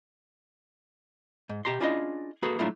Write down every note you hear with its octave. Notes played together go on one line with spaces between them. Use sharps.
G#2
B2 G4 A#5 C6
C#4 D4 E4 F4 G#4 D#5
A#3 F#4 G#4 A4 B4
F#3 A3 A#3 D4 E4 F4